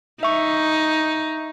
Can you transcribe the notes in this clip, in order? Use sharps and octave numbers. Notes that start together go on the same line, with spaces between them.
D#4 E5 C#6